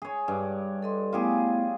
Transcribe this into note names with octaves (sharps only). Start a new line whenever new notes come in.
G#4 C#5
G2
A4 D#5 C6
A3 B3 E4 F4 G4 G#4